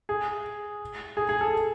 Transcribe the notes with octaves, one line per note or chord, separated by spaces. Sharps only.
G#4
G#4
G#4
A4